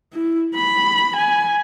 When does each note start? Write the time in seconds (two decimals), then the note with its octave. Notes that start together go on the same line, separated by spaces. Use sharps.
0.13 E4
0.55 B5
1.17 G#5